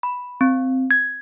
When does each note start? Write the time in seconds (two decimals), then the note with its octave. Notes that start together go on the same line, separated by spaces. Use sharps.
0.03 B5
0.41 C4
0.91 G#6